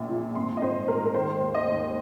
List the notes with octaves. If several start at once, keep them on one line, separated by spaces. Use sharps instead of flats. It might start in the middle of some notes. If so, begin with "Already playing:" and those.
Already playing: A#1 A#2
F3
G#1 C6
D#5
G#1 C5
G#2 A#4
A#4
D#3 C5
D#2
D#5
D#2